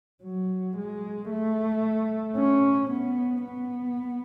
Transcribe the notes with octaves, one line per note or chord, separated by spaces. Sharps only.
F#3
G#3
A3
C#4
B3
B3